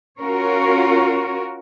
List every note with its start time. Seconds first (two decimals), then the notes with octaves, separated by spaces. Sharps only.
0.19 C#4 F4 F#4 A#4 C#5